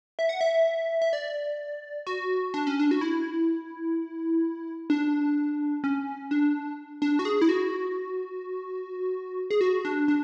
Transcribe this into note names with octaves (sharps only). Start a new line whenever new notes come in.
E5
F#5
E5
E5
D5
F#4
D4
C#4
D4
F#4
E4
D4
C#4
D4
D4
F#4
G#4
E4
F#4
G#4
F#4
D4
D4